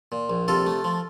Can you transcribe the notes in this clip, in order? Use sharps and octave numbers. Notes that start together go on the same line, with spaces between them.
A#2
A#1
C3 F4 A4
A3
F3